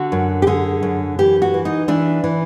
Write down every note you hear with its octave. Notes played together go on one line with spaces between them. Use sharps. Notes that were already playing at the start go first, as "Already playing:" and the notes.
Already playing: D3 F#4
F#2
G4
D3 G#4
F#2
E3 G4
F#4
E3
D#4
E3 D4
E3